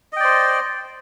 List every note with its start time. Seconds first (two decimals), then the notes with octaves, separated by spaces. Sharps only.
0.13 D#5
0.16 G5
0.20 D5
0.24 C5